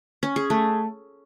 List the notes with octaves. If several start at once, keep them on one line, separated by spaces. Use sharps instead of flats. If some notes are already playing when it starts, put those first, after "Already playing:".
C#4
G#4
A3